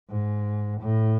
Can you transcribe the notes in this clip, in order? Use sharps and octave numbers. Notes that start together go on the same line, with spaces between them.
G#2
A2